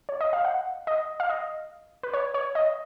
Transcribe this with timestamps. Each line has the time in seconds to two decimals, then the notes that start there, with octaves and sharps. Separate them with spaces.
0.09 C#5
0.21 D#5
0.33 F5
0.45 F#5
0.87 D#5
1.20 F5
1.29 D#5
2.03 B4
2.14 C#5
2.34 C#5
2.55 D#5